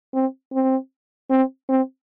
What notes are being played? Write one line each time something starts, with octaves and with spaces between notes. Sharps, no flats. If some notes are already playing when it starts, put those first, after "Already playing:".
C4
C4
C4
C4